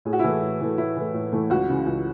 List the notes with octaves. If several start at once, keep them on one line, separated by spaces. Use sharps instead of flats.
A2 G#4
F#4
E4
E3 A3 F#4
A2
E3 A3
A2 E4
E3 A3
A2
E3 A3
C#2 F#4
C#3 E3
C#2